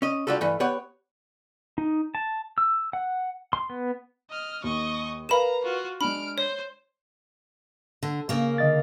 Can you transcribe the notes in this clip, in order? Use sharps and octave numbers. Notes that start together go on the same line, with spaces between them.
C#4 D#5
G3 D4 F4 F#4 A4
G2 E3 A3
B3 G4 C#5 F#5
D#4
A5
E6
F#5
C6
B3
D#5 F6
D#2 D#5 C#6
A#4 B4 F5 A#5 B5 E7
F4 F#4
G#3 D4 B5 F6 D7
C5 C#5
D3
C#3 A#3
D3 D#5 A6